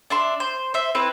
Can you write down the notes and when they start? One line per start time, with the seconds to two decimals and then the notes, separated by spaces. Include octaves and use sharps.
0.10 D4 E5 C6
0.40 C5
0.74 C5 E5
0.95 C4 E4 B4